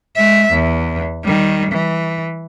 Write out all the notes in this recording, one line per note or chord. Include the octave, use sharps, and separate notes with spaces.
G#3 E5
E2
D#3 G3
E3